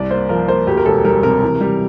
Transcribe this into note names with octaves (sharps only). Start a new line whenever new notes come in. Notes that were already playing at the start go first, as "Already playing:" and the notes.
Already playing: C2 D5
A#3 C5
F3 A#4
A#3 C5
D2 G4
A#4
E1 A4
G3 A#4
C3 A#4
E3
G3